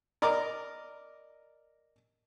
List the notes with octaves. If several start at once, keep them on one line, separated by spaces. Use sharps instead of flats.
A#4 D5 D#5 A#5 D6